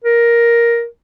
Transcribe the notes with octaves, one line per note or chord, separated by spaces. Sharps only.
A#4